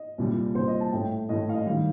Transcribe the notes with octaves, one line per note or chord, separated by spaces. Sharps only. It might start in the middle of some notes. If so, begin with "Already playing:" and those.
Already playing: D#5
C2 A#2 G3
C2 A#2 G3 C5
D#5
A5
A2 A3 G5
A2 A3 D#5
F5
D#5
D#3 G3 F5